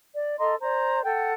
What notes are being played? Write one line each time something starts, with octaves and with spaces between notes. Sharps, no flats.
D5
A4 D#5 A#5 C6
C5 D5 A#5
A4 F#5 G5